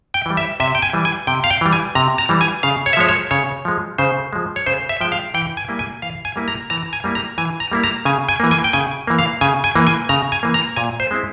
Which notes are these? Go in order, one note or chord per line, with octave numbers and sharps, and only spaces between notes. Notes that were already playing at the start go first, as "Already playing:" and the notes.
G5
E3 G3
E5
C3 E5
G5
G#5
E3 G3
G#5
C3 G5
F5
G5
E3 G3
G#5
C3 A#5
A#5
E3 G3
G#5
C#3 F5
C#5
E5
F3 G#3 C#5
C#5
C#3 C#5
F3 G#3
C#3 C5
F3 G#3
C#5
C#3 C5
E5
F3 G#3 G5
F5
E3 G5
G#5
G3 A#3 E4
G#5
E3 F5
G#5
G3 A#3 E4
A#5
E3 A#5
G#5
G3 A#3 E4
A#5
E3 G#5
A#5
G3 A#3 E4
A#5
C#3 G#5
G#5
E3 A#3
G#5
G5
C#3 G#5
E3 A#3
F5
C#3 G#5
G#5
E3 A#3
G#5
C#3 A#5
G#5
E3 A#3
A#5
A#2 G#5
C5
G#3 C4 E4